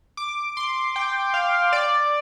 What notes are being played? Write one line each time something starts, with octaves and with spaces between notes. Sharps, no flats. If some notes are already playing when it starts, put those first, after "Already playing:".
D6
C6
G5
F5
D5